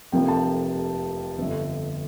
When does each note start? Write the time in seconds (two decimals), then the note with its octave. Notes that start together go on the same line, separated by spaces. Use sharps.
0.12 F1 F2 C3 F3 A#3 G5
0.28 A5
1.38 G1 F2 D3 E5